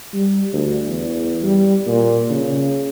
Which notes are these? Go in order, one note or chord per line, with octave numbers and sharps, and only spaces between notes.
G3
D2
E2
G3
A#2
C#3